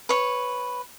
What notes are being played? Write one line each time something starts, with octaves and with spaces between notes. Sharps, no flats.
B4 C#5